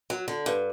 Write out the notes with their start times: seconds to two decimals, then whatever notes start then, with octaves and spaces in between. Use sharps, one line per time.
0.10 F#3
0.28 D3
0.46 G2